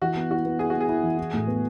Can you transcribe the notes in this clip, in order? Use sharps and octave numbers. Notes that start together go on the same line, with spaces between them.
E3 F#4
B3
E4 F#4
B3
E4 G#4
B3 F#4
G#4
E4
E3
E4
A2
B3